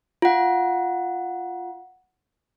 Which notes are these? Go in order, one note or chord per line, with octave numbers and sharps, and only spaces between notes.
F4 F#5